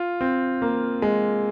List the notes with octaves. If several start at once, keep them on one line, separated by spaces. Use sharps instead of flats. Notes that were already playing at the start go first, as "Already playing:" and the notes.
Already playing: F4
C4
A#3
G#3